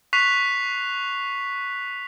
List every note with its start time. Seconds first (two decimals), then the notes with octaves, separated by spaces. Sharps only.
0.13 C#6 F#6 B6 C7 F7